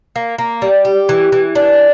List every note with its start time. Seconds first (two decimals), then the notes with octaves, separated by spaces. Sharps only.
0.16 A#3
0.39 A#3
0.62 G3
0.85 G4
1.09 E3
1.32 E3
1.55 D4